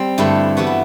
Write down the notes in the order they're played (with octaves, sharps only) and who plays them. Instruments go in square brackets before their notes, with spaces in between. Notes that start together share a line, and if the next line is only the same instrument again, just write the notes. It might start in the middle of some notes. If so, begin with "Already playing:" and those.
Already playing: [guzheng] G3 C4
G2 D3 A3 E4
E3 G3 B3 F#4
E4